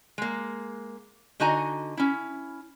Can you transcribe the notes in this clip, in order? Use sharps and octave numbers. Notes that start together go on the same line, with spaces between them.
G#3 A#3
D3 D#4 F#4 D#5 G#5 A#5
C#4 E4